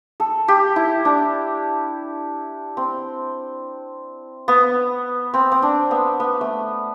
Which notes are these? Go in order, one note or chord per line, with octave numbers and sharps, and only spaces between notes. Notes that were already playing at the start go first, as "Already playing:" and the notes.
A4
G4
E4
D4
C4
B3
C4
C4
D4
B3
B3
A3